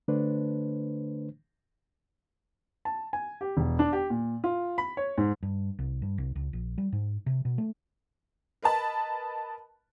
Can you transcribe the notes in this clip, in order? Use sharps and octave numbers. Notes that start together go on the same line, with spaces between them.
D3 A3 D4 B4 C5
A5
G#5
G4
E1
D4
G4
A#2
F4
B5
C#5
G#2
G2
C2
G2
C2
C#2
A#1
G3
G#2
C3
B2
A3
A#4 B4 D#5 A5 B5